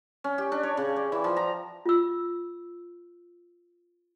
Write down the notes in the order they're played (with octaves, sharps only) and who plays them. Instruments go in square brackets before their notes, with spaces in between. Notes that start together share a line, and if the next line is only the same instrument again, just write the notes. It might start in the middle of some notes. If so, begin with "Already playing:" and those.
[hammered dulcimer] C#4
G4
D4
C#5
C#3
D5
E3
F3
A#5
[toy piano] F4 E6